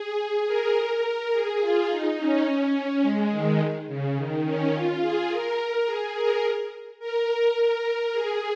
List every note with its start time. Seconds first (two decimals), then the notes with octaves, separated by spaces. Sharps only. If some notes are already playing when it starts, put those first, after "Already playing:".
Already playing: G#4
0.47 A#4
1.32 G#4
1.61 F4
1.89 D#4
2.17 C#4
3.02 G#3
3.31 D#3
3.87 C#3
4.16 D#3
4.44 C#4
4.72 F4
5.01 G#4
5.29 A#4
5.85 G#4
6.15 A#4
6.99 A#4
8.13 G#4